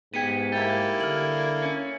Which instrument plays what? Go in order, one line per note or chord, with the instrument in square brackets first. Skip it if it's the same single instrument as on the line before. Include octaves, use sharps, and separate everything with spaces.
[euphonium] G#2 [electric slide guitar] B3 G4 [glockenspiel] G#6 C#7 D#7
[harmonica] A#3 E4 [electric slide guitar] G4 [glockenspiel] A6
[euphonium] D3 [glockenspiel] F6 F#7
[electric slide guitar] C#4